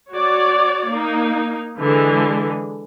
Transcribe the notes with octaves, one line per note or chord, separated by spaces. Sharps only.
F#4 C#5 D5
A#3 D#4
D3 E3 G#3